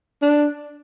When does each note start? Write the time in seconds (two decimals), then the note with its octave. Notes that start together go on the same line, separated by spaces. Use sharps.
0.22 D4